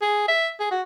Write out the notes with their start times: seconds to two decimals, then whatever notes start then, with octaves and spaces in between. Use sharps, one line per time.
0.02 G#4
0.28 E5
0.60 G#4
0.71 F#4